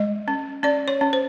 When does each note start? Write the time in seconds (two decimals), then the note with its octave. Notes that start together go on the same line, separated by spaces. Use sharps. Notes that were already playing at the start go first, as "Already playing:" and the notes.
Already playing: G#3 D#5
0.28 C#4
0.63 C#4 D5
0.88 C#5
1.01 C#4
1.13 C5